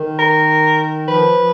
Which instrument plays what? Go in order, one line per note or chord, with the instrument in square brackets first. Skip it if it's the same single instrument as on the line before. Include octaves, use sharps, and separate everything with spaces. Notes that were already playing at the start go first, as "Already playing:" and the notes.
Already playing: [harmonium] D#3
[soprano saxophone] A#4
[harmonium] F3 [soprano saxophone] B4
[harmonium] F3